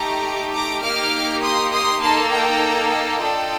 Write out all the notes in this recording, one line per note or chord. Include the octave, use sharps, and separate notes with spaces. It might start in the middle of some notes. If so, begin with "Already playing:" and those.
Already playing: A3 D#4 G4 A#5 D6
A#5 D6
A#3 D#4 G4 D6 F6
C6 D#6
C6 D#6
A#3 D#4 A4 A5 C6
G5 A#5
D#5 G5
D4 F4 A4